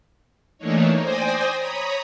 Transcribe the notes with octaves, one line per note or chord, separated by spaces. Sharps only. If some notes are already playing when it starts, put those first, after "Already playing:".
E3 A3 A#3 D4 D#4 C#5
C5 D5 G5 G#5 D#6 A#6
C#5 A#5 B5 D#6